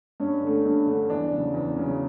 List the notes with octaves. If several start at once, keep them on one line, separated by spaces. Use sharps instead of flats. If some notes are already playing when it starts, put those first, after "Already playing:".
G2 C#4
D3 A3
G2
D3 A3
E2 D4
C#3 F#3
E2
C#3 F#3